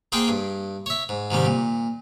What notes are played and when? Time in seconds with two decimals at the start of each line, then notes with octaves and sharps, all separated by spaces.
0.12 A#3 G#4 C5 F#5 G5 A5
0.28 G2
0.86 C#5 E5
1.09 G#2
1.31 G#2 C3 D#3 G3
1.45 A#2